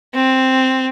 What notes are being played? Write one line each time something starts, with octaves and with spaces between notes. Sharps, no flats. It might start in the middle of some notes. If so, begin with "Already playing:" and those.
C4